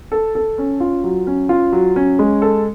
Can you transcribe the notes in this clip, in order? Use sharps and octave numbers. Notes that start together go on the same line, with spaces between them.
A4
A4
C#4
F4
F#3
C#4
F4
F#3
C#4
G#3
A4